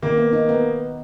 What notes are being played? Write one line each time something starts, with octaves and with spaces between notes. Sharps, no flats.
D#3 A#3
B3
D#4
B3